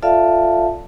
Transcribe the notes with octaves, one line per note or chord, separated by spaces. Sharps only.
F4 A4 D5 E5 F5 A5